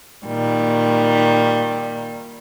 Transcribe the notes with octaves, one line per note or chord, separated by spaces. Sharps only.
A#2 D#3 G3